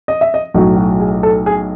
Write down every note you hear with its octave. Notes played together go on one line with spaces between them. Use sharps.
D#5
E5
D#5
B1 A2 F#3 F#4
F#4
G#4
A4
G#4